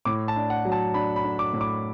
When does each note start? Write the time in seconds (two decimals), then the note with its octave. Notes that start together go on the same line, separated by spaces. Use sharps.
0.05 A2 D6
0.28 A5
0.36 D4
0.50 F#5
0.65 F#3
0.72 A5
0.94 D4 B5
1.16 B5
1.24 D4
1.39 D6
1.53 A2
1.61 D6